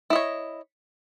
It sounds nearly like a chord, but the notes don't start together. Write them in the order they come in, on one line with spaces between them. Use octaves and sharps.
E4 D#5 C#5